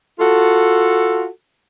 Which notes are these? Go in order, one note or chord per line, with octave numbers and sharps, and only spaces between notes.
F4 F#4 A4